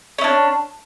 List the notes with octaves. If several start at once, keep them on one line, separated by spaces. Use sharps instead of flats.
C#4 D4 E4